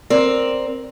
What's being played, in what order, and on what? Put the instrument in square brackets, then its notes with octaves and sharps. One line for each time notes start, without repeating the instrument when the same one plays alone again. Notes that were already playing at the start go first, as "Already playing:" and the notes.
[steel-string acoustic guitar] C4 A#4 D5